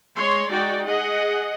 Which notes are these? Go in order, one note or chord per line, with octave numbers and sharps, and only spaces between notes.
G#3 C#5 C6
G#3 D#4 F#4 D5 G5
G#4 D#5 F#5